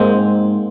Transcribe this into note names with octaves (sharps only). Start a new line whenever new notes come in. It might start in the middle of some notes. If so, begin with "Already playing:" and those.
Already playing: G#2 G#3 A#3 C4